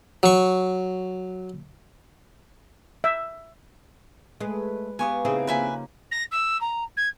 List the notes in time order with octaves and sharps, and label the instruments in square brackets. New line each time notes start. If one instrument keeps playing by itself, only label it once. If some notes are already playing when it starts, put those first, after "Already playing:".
[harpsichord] F#3 C#6
[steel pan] E5
[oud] G#3 [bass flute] A3 [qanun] B4
[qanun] B3 G4 [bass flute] F5 [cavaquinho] G#5 C#6 D#6
[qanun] C#3 D#4 [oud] C4 E4 G#4
[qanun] C#3 F3 A#3 [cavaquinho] B4 E5 G#5
[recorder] A#6
E6
A#5
G#6